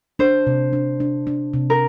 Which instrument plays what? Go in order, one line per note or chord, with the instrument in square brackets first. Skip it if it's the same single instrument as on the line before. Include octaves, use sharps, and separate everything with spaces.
[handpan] D4 [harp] C5
[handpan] C3
D4
D4
D4
C3
[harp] A#4